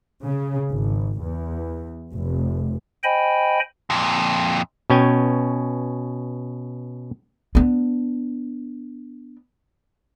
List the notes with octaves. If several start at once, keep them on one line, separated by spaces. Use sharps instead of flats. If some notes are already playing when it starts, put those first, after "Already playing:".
C#3
G#1
E2
F1
C5 D#5 G5 G#5 B5
F2 A#2
B2 C#4 G5 G#5
B3 D4